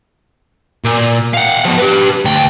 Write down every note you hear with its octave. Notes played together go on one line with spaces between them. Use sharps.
A#2
F5 F#5
F3 B3
G4 B4
D2 G5